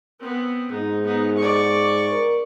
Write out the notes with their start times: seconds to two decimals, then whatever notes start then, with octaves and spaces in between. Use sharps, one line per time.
0.20 B3 C4
0.71 G#2 D#4
1.04 B3 D#4
1.38 D5 C#6
2.11 A#4